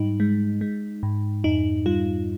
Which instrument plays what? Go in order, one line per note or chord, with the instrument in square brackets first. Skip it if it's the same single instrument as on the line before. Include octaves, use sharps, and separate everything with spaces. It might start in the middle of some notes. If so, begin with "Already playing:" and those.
Already playing: [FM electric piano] G#2 G3 D#4
G#3
G#3
G#2
F2 D#4
G3 F4